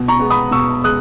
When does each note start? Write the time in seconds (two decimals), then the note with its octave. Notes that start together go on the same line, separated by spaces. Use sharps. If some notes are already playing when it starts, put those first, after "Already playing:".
Already playing: B2
0.08 A#5 C#6
0.19 G#3 B3
0.30 B5 D#6
0.51 B2 C#6 E6
0.84 G#3 D#6 F#6